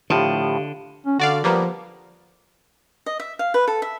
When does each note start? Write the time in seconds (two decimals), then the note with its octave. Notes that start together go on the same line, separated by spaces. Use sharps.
0.10 A2 D3 F3 G4 F5
1.06 C#4
1.19 D3 F#4 D5 F5
1.44 F3 G3 A#3 B3
3.06 D#5
3.20 E5
3.39 F5
3.54 B4
3.68 A4
3.82 E5